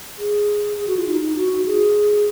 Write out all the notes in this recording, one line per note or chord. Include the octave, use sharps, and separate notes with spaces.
G#4
G#4
F#4
F4
D#4
D#4
F#4
G#4